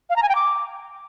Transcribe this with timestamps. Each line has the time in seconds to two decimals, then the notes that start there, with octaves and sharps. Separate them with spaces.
0.10 F5
0.16 A#5
0.23 G#5
0.29 G5
0.35 D6